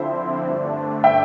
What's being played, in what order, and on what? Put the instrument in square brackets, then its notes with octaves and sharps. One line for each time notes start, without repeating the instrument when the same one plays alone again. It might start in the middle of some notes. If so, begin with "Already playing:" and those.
Already playing: [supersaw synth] D3 F3 C4 E4 [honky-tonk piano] C5 E5
[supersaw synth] G2 D3 A3 D4
[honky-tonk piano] E5 G5